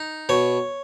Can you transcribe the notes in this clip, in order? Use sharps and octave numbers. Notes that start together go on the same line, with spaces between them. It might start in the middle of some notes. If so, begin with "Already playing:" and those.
Already playing: D#4
B2 C#5